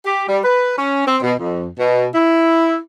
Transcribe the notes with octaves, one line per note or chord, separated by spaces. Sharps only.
G4
G3
B4
C#4
C4
B2
F2
B2
E4